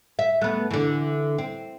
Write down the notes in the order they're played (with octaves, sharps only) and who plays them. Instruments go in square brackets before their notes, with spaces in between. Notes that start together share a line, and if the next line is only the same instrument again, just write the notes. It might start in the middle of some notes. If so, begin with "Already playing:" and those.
[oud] E5
A3 B3
D3 E3
C4